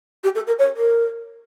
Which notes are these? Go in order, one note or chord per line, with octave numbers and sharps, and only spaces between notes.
G4
A4
A#4
C#5
A#4